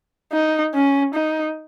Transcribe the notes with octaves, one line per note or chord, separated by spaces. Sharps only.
D#4
C#4
D#4